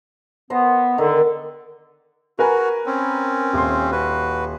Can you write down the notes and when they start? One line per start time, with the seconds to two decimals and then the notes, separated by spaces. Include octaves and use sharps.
0.50 B3 C5 D#5
0.98 D3 D#3
2.39 F#4 A#4 B4 G#5
2.86 C4 C#4
3.54 D#1 C6
3.92 F#4 B4